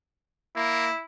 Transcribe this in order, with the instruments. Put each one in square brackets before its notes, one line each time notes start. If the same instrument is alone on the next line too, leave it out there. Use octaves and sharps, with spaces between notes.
[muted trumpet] A#3 [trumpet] E4